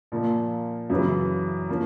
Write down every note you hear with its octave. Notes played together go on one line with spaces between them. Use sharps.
A#2 F3 A#3
F#2 C#3 E3
F3 A#3 C#4